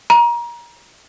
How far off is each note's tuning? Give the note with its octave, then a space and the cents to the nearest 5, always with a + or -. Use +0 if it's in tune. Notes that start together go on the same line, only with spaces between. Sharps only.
A#5 +25